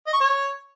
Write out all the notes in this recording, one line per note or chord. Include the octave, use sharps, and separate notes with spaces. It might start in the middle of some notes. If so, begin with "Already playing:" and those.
D#5
C#6
C#5